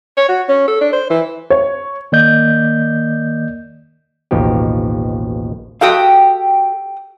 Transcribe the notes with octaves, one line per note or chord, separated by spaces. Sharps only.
C#5
F#4
C#4
A4
D4
C5
E3
C#5
D#3 A#3 D5 D#5 G6
A1 D#2 B2 F3 D#4 G4
F#4 G4 A4 F5 G5 D#6